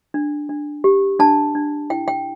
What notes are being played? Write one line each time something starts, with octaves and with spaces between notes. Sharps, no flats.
D4
D4
G4
D4 A5
D4
E4 G5
G5